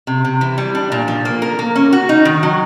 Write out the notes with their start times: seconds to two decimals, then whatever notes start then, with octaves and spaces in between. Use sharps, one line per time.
0.07 C3
0.24 C3
0.41 E3
0.58 G3
0.75 D4
0.92 A#2
1.08 F3
1.25 A#3
1.42 A#4
1.59 A#3
1.76 C#4
1.92 F#4
2.09 D#4
2.25 D#3
2.43 F#3